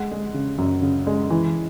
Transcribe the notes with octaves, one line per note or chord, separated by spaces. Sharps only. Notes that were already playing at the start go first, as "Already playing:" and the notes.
Already playing: G#3 F#5
G#3
C#3
F#2
C#3
G#3
E3